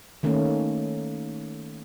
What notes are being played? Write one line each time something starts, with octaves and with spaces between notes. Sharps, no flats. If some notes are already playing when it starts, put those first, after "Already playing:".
D#3 A3 A#3 C#4